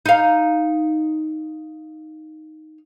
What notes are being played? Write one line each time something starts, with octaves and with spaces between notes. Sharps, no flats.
D#4 F5